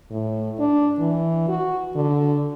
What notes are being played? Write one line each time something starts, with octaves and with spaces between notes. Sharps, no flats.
A2
D4
E3
F#4
D3